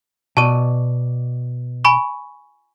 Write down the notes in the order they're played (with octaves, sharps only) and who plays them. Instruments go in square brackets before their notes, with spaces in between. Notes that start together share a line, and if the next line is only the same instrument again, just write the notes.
[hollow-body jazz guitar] B2 D5 [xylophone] A5 C#6 D#7
[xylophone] G#5 B5 C#6